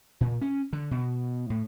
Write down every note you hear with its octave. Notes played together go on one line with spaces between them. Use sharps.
A#2
C#4
D3
B2
A2